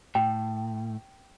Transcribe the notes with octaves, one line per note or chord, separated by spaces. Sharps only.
A2 G5